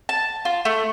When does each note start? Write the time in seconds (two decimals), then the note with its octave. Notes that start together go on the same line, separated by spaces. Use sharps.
0.09 A5
0.45 F4
0.65 A3